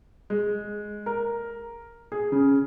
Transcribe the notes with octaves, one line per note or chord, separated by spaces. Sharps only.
G#3
A#4
G#4
C#3